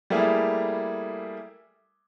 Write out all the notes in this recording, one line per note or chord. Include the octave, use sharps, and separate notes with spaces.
G3 A3 A#3 E4 G#4